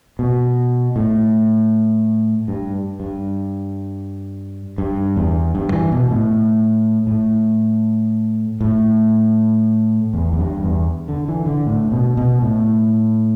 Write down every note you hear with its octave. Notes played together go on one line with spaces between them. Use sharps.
B2
A2
G2
G2
G2
E2
G2
E3
B2
A2
A2
A2
E2
E2
G2
E2
D3
E3
D3
A2
B2
B2
A2